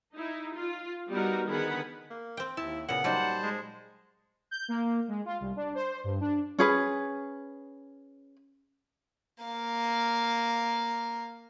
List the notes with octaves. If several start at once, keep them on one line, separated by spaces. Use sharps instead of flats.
D#4 E4
F4
G3 B3 D#4 F#4 A#4
D3 D#3 B3 G#4 F#5 B5
A#3
C4 G5
D#2 E4 A5
A#2 C#3 B3 F#5
F#3 G3 A#3 D#4 C5 A5
G#3
G6
A#3
G#3
F4
C2
D4
C5
G2
D4
C#4 G#4 B4
A#3 F5